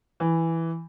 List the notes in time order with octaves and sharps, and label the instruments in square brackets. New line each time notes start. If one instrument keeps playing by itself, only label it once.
[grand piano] E3